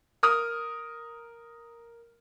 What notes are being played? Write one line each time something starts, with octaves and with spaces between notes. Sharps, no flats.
A#4 D#6 F6